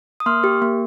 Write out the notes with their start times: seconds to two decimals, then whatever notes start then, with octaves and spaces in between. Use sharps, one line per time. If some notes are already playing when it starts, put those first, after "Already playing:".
0.20 D#6
0.26 A#3 C6 F6
0.44 G4
0.62 A#3